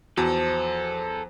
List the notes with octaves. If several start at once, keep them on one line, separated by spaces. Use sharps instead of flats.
E2 F3 F#4 A4